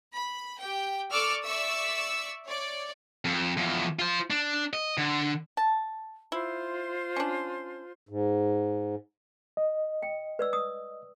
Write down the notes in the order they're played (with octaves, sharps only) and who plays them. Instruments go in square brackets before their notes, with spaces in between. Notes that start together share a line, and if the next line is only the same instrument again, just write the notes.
[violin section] B5
G4 G5
A4 D5 C#6 D6 E6 F6
D5 E5 C#6 E6
C#5 D5
[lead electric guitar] F2
E2 F3
F4 C5
D4
D#5
D3
[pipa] A5
[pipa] E4 [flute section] F4 C5 C6
[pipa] C#4 D4
[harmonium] G#2
[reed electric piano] D#5
[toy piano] G5
B4 D5 E6
D#6